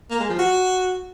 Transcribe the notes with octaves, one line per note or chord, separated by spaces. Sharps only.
A#3
G#3
F3
F#4